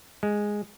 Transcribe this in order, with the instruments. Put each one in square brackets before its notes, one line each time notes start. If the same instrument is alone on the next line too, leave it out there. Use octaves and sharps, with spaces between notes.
[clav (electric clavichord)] G#3